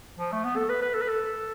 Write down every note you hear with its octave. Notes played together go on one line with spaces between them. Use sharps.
F3
A3
B3
A4
B4
B4
A4
B4
A4